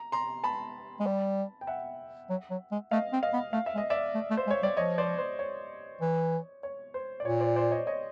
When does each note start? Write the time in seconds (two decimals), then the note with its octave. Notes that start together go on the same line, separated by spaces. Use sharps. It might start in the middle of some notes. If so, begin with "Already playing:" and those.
Already playing: A#5
0.12 A#5 C6
0.44 A5 B5
1.00 G#3
1.06 G3
1.61 G5
1.67 E5 F#5
2.30 F#3
2.50 F#3
2.71 G#3
2.91 A3 D#5 F5
3.13 C4
3.23 D#5 F5
3.33 B3
3.53 A3 F5
3.66 E5
3.75 G#3
3.78 D#5
3.90 D5 E5
4.15 A3
4.30 A3
4.37 C5
4.47 G#3
4.51 C#5
4.62 G3 D5
4.77 F3 C#5 D#5
4.98 C5 D5
5.18 C5
5.39 C#5
6.01 E3
6.63 C#5
6.94 C5
7.20 D5
7.24 A#2 C#5
7.40 C5 D5
7.56 C5 D5
7.71 C#5 D#5
7.87 C#5 D#5